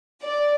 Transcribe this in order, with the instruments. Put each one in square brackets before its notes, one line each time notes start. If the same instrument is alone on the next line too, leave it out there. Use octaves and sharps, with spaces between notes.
[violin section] D5